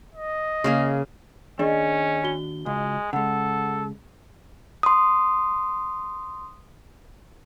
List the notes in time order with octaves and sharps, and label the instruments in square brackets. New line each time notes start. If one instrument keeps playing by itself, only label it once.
[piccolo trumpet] D#5
[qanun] C#3 A#3 G#4
[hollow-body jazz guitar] D#2 D4 [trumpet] C#4 [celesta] G#4 D#5
[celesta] F#4 G7
[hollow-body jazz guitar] C#2 [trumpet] G#3
[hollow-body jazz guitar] C#3 G#3 [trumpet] A4 [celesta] F#5
[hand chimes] C6 D#6